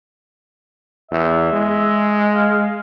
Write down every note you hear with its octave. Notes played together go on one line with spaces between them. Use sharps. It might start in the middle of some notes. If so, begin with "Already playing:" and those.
E2 E5
G#3
F5